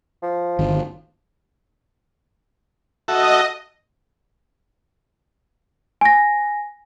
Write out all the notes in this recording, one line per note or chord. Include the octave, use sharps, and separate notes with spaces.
F3
G1 D#3
F#4 A4 D#5 E5
G#5 A#6